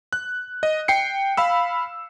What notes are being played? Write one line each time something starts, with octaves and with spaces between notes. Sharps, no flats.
F#6
D#5
G5 C7 C#7
F5 B5 E6